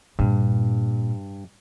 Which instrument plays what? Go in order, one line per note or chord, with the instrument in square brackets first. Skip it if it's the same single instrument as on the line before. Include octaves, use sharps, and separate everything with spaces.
[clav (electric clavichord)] G2 [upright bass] A#2